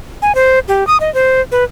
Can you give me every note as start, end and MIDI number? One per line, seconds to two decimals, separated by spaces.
0.22 0.35 80
0.35 0.59 72
0.68 0.86 67
0.87 0.97 87
1.00 1.12 75
1.14 1.41 72
1.52 1.64 71